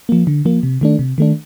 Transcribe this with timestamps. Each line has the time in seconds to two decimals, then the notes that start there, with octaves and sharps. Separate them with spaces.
0.09 F3 A#3
0.27 D3
0.45 F3 A#3
0.63 C3
0.81 D#3 A3 D4
0.99 C3
1.18 D#3 A3 D4